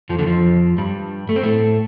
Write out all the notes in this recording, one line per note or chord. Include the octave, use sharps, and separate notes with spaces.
F2 F3
D3
F2 F3
G2 G3
A3
C4
A2 A3